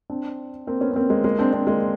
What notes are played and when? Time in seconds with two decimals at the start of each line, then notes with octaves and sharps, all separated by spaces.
0.10 C4 D4
0.67 A#3 C4
0.81 B3 C#4
0.92 C#4
0.96 A#3 C4
1.10 G#3 A#3
1.24 G#3 A#3
1.39 C4 D4
1.52 C4 D4
1.67 G#3 A#3